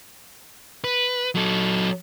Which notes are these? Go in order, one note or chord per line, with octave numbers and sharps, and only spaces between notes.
B4
F#3 A4